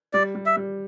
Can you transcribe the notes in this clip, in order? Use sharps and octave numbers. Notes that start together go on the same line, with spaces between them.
G3 D5
G3
E5
G3